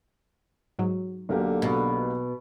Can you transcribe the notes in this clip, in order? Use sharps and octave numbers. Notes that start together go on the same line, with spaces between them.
G#2 F#3
B1 D3 A#3 G4
B2